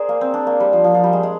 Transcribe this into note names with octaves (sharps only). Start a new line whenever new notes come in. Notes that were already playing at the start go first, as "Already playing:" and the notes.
Already playing: G#4 A#4 C5 D5
A#3
C4
D4
A#3
G3
F3
F3
F3
G3
G#3
G#3